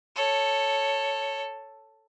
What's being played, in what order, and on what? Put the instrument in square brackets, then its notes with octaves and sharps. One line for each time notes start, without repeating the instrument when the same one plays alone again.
[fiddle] A4 C#5